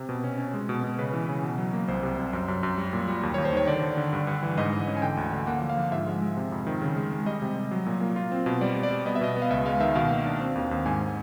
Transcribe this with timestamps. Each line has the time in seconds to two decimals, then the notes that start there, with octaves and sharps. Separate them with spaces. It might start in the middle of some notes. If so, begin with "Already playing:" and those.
Already playing: C3
0.09 B2
0.24 C#4
0.38 C#4
0.54 G#3
0.69 B2
0.84 B2
0.98 C#3 B4
1.13 E3
1.29 C#3
1.43 B2
1.58 F#3
1.73 A#3
1.88 C2 C5
2.03 C3
2.18 C2
2.33 F#2
2.48 F#2
2.63 F#2
2.78 G3
2.93 A#2
3.08 G3
3.23 D#2
3.34 D#2 C#5
3.45 C5
3.53 D#3 C#5
3.67 D3 D5
3.83 D3
3.97 D3
4.13 G2
4.27 G2
4.43 E3
4.57 G#2 D#5
4.73 E3
4.87 C#4
4.97 G#5
5.02 D3 G5
5.17 D2
5.32 D3
5.47 A#3 F#5
5.62 F3
5.70 F5
5.77 F3
5.92 G#2 E5
6.07 G#3
6.22 G#3
6.37 C3
6.52 F2
6.67 D#3
6.81 C#3
6.97 G#3
7.12 G#3
7.26 G3 D#5
7.42 C3
7.56 G3
7.71 F#3
7.86 A#2
8.01 A#3
8.16 F4
8.32 C4
8.46 B2
8.61 G3 D5
8.76 G3
8.83 D5
8.91 G3
9.06 B3 D#5
9.15 E5
9.21 B2 D#5
9.36 B3
9.42 F5
9.50 C#2 E5
9.66 G#3 F5
9.80 D#3 E5
9.95 B2 F5
10.11 A#3
10.26 D4
10.40 C4
10.55 D#2
10.71 D#2
10.86 G#2 G#5